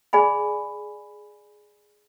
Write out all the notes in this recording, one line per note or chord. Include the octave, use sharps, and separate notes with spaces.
G#4 D5 G#5 B5